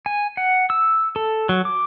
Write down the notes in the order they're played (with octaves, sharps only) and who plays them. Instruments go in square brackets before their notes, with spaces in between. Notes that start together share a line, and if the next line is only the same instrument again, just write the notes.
[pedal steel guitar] G#5
F#5
E6
A4
F#3
D6